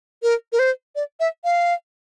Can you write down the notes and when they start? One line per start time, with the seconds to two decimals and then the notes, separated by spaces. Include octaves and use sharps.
0.23 A#4
0.52 A#4
0.59 C5
0.96 D5
1.20 E5
1.44 F5